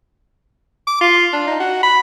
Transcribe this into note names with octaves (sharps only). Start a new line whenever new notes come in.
D6
F4
D4
D#4
F#4
B5